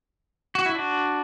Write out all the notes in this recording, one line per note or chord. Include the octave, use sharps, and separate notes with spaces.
F#4
E4
D4 F#4